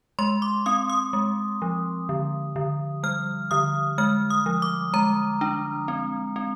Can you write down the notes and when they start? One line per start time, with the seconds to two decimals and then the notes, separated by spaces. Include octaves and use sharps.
0.19 G#3 C6
0.42 D6
0.66 C4 D#6
0.90 D#6
1.13 G#3
1.62 F3
2.09 D3
2.56 D3
3.03 G3 F6
3.51 D3 D#6
3.98 G#3 F6
4.30 D#6
4.46 F3
4.62 D6
4.94 G#3 A#5
5.41 D4
5.88 C4
6.36 C4